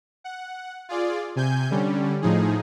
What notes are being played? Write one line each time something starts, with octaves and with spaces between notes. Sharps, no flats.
F#5
F4 G#4 D5
C3 G#5 G6
D3 G3 C#4
A2 F3 D#4 G#4